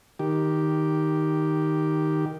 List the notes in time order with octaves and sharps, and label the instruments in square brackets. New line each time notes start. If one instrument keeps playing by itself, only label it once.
[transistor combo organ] D#3 G4